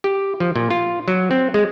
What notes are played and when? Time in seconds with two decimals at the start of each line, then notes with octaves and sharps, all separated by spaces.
0.04 G4
0.40 F3
0.56 A#2
0.70 F4
1.08 F#3
1.31 C4
1.54 G#3